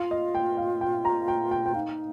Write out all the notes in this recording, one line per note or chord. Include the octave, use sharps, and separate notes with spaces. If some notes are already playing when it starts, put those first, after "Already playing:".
Already playing: F4 F5
D#5
G5
F5
G5
A#5
G5
G5
G5
D#4 F5